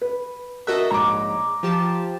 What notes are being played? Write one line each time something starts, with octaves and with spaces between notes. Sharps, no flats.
B4
F#4 A4 A#4 D#5 E5 F#6
A#1 G#2 C#5 A#5 D6
F3 G4 A5